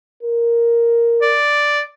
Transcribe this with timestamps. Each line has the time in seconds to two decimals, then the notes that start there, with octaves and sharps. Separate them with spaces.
0.23 A#4
1.22 D5